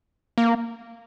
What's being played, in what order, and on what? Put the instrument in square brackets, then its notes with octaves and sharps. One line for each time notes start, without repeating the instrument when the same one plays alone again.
[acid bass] A#3